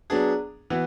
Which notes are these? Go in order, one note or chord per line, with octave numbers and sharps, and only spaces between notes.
F#3 B3 D4 G#4
E3 B3 F#4